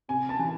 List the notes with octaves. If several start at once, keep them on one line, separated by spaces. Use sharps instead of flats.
C3 G#5
A5
E3